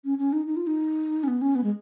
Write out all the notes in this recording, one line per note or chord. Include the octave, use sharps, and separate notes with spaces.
C#4
C#4
D#4
D#4
F4
D#4
C#4
B3
C#4
B3
G#3